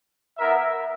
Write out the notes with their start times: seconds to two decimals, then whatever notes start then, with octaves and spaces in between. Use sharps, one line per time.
0.38 B3 E4 A#4 E5